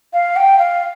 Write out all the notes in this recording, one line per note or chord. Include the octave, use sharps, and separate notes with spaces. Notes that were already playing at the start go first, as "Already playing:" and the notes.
F5
G5
F5